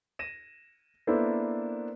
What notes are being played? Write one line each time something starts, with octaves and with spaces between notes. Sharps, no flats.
A#6 D#7 E7
A#3 B3 D4 E4 A4 C5